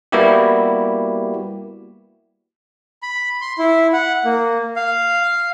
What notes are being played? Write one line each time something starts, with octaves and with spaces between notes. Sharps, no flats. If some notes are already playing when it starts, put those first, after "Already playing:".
G3 A#3 B3 E4 F#4 G4
B5
C6
E4
F#5
A#3
F5